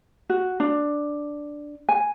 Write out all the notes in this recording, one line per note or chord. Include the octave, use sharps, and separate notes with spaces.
F#4
D4
G#5